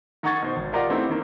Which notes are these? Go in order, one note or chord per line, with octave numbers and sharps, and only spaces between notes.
D#3 D#4 F#5 C#6 G#6 A6
B2 C5
G#1
F4 G4 A#4 D5 D#5 F#5
A3 B3 C4 D#4 E4 G4
D#3 A#3